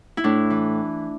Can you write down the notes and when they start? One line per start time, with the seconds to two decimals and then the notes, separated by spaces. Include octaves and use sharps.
0.17 E4
0.24 A2 D4
0.50 E3